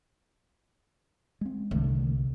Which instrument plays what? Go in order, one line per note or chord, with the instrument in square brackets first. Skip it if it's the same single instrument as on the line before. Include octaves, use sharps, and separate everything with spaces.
[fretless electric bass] G#3 C4
[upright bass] C2 [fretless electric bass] D3 D#3 A3